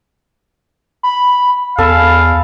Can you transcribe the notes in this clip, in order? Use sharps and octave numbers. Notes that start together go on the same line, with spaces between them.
B5
E2 A4 F5 G#5 A5 B5